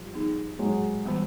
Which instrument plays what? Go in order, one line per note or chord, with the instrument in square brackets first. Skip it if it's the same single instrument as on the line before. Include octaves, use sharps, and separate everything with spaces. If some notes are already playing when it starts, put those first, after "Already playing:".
Already playing: [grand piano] F3 G3
[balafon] B3 D#4 G#4
[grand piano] F#3 G#3
[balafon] E3 G3 B3